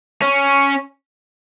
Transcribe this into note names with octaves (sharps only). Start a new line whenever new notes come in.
C#4